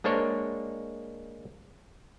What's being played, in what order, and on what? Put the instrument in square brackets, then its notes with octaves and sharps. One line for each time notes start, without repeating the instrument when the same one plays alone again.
[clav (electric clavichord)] G#3 A#3 D4 C5 C#5